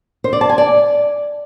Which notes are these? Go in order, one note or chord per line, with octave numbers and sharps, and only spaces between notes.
C5
D5
A5
G#5
D5